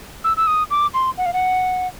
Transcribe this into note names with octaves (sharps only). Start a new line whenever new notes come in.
E6
E6
D#6
D6
C6
F#5
F5
F#5